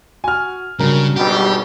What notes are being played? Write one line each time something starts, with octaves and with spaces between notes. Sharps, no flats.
F#4 G#5 F6
G2 C#3 F#3 A#4
G#1 B2 G3 F#4 G4